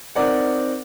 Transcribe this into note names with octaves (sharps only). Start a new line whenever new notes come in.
C4 D#4 A#4 D5 F#5